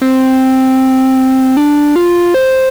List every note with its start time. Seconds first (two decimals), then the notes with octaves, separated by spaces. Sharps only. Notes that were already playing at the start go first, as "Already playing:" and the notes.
0.02 C4
1.57 D4
1.96 F4
2.34 C5